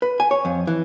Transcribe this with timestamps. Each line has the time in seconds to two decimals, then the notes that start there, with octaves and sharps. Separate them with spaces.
0.02 B4
0.20 G#5
0.31 C#5
0.45 F2
0.67 E3